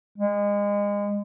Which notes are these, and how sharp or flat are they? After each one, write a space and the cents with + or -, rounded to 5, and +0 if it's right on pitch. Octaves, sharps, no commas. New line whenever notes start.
G#3 -30